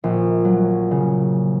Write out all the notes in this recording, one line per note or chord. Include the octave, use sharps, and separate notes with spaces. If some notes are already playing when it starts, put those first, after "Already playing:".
A#1
F#3
C#3